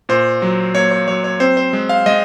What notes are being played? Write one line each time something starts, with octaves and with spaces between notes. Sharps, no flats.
A#2 C5
F#3
A#3 C#5
C#5
F#3 C#5
C#5
C4 C5
C5
G#3
F5
G#3 D#5